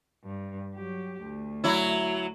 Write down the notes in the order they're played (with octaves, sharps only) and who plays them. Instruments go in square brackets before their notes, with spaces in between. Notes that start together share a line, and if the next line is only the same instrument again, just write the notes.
[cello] G2
F#3 G4
D2
[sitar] F#3 E4